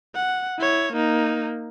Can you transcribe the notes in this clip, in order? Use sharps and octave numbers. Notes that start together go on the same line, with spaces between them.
F#5
E4 C#5
A#3 D#4